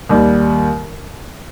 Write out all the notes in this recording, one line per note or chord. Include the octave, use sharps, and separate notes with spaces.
D#2 D#3 G3